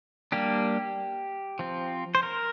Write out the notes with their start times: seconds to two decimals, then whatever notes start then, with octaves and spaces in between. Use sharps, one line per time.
0.32 G3 A#3 D4 G4
1.59 F3 C4
2.15 C5
2.23 A#4